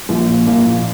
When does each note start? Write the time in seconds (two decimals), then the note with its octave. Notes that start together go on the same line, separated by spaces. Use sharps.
0.09 A#1
0.28 A#2
0.47 A#1 A#3
0.66 A#2